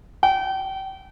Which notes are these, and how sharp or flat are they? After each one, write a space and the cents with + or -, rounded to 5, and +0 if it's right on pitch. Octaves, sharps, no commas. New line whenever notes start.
G5 -35